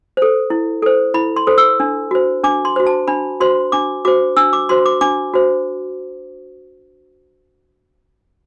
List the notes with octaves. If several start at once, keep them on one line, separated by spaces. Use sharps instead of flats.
A4 C5
E4
A4 C5
E4 B5
C6
A4 C5
E6
D4
F#4 C5
D4 D6
C6
F#4 C5
A5
D4 B5
F#4 C5 C6
D4 D6
F#4 C5 D6
D4 E6
D6
F#4 C5 C6
D6
D4 D6
F#4 C5